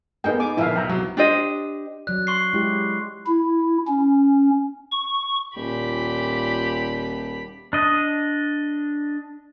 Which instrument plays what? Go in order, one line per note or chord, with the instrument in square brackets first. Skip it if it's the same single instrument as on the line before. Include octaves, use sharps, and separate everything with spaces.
[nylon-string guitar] A#3 A4 [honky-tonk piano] B3 D#4 G#4 [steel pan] G5
[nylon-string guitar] G#5 [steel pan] D6
[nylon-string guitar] A#2 D3 F3 [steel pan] E4 E5 F5
[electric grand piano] B1 [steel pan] G5 A#5
[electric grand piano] C3 F#3 [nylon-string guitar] B3
[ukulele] D4 G4 C5 D#5
[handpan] F#3 D5 [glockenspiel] F#6
[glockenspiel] C6 C#6 C7
[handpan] G#3 E4 G4
[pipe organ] E4
C#4
C#6
[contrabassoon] D#1 [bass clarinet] A#2 [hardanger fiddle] G4 B5
[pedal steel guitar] D4 D#5